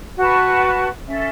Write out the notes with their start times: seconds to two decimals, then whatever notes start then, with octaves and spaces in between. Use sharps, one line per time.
0.17 F#4 B4 A5 C#6
1.07 C#4 A4 E5